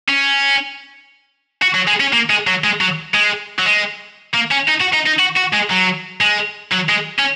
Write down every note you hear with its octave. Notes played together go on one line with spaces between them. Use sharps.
C#4
F#4
F#3
G#3
C#4
A#3
G#3
F#3
G#3
F#3
G#3
F#3
G#3
A#3
C#4
D#4
F#4
D#4
D#4
F#4
F#4
G#3
F#3
G#3
F#3
G#3
C#4